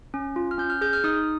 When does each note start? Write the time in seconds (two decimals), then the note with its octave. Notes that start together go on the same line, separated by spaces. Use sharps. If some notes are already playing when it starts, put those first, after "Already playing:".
0.14 C#4
0.36 F4
0.51 F6
0.58 C#4 G6
0.70 F6
0.81 G#4 G6
0.93 F6
1.04 D#4 D#6